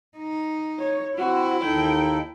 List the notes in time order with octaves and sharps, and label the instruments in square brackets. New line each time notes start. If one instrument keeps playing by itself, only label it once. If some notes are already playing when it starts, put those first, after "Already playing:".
[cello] D#4
[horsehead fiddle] C#5
[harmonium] C4 [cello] E4 [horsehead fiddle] F#4
[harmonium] D#2 D#4 A4 [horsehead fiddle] G5